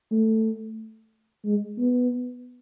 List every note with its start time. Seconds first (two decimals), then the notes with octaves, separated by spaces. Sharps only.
0.11 A3
1.45 G#3
1.79 B3